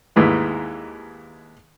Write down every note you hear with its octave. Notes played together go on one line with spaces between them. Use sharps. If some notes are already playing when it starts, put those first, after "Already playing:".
D#2 G#2 E3 A3